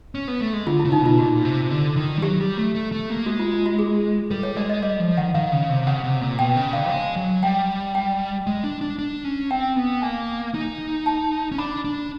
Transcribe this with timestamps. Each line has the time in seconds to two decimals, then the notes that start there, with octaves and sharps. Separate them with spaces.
0.15 C#4
0.28 B3
0.41 A3
0.53 G#3
0.67 D3 F4
0.79 E4
0.84 C#3
0.92 D#4
1.01 B2 F4
1.18 A#2 F#4
1.45 C3
1.70 D3
1.96 D#3
2.17 G3
2.22 F#3 G4
2.40 G3
2.57 A3
2.75 A3
2.92 A3
3.10 A#3
3.26 G#3 F#4
3.39 F4
3.53 F4
3.66 F#4
3.79 G#4
4.30 G3 A4
4.43 C#5
4.56 G#3 D5
4.69 D#5
4.82 G3 D#5
5.00 F3
5.17 D#3 F#5
5.34 D#3 F5
5.52 C#3
5.69 C3
5.87 C#3 F#5
6.04 C3
6.21 A#2
6.39 B2 G5
6.56 C#3
6.73 D3 F5
6.90 G#3
7.16 F#3
7.43 G3 G5
7.95 G5
8.47 G#3
8.64 D4
8.81 D4
8.99 D4
9.25 C#4
9.51 C4 G5
9.76 B3
10.02 A#3 G#5
10.54 D#4
11.06 A5
11.52 C#4
11.58 D4 B5
11.85 D4